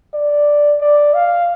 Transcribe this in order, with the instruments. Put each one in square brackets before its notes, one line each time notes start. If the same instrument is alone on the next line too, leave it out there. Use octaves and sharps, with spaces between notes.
[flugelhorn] D5
D5
F5